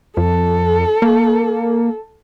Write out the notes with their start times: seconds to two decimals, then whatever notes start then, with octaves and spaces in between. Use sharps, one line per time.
0.17 F2 A4
1.02 A#3